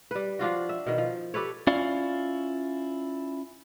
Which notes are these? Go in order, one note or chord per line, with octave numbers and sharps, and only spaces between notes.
G3 B4
F3 D4 F4 F#4
E5
B2 D#3
F3
G4 A4 B4 C#5
C#4 E4 F4 D5 F5